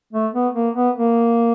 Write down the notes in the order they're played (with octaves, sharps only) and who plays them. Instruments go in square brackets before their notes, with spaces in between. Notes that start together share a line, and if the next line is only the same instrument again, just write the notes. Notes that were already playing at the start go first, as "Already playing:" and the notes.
[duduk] A3
B3
A#3
B3
A#3